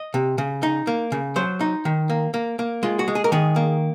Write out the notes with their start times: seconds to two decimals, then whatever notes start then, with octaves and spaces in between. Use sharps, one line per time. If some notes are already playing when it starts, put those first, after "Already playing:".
Already playing: D#5
0.14 C3
0.38 C#3
0.63 D#4
0.87 A#3
1.12 C#3
1.36 F#3 C5
1.61 D#4
1.85 D#3
2.10 A#3
2.34 A#3
2.59 A#3
2.83 G#3 F4
2.99 F#4
3.08 G#3
3.15 G#4
3.24 A#4
3.32 D#3 G#4
3.56 A#3